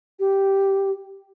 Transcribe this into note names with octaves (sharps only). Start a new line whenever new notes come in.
G4